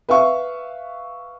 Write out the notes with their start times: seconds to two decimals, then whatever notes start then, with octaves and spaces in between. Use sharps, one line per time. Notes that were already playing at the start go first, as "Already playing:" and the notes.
0.09 B4 E5 F5 C#6